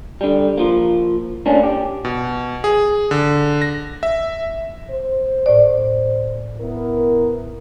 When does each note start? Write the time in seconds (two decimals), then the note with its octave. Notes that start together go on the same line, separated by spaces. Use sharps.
0.21 D3 G3
0.58 F3 A#3
1.46 A2 A#3 C#4 D4
1.64 G4
2.05 B2
2.64 G#4
3.11 D3
3.62 A#6
4.03 E5
4.90 C5
5.46 A2 D5
6.58 B3 E4 A#4